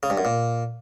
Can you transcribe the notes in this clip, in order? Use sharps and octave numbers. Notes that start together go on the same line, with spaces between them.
C#3
G2
F#2
A#2